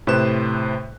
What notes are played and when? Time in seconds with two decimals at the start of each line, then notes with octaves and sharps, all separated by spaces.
0.07 A2 C3 B4 C5 F#6 E7